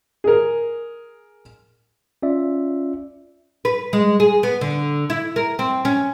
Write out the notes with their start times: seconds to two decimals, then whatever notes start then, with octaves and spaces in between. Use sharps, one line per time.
0.24 G#4 A#4
2.22 C#4 F4 D5 E5
3.65 B4
3.93 G#3
4.20 G#4
4.43 B3
4.61 D3
5.10 E4
5.36 A#4
5.59 C4
5.85 C#4